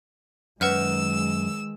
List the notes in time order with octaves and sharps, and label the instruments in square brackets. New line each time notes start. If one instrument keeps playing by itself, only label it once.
[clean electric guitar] F#2 [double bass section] D#3 G#3 [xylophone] B4 F#5 F6 [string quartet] E6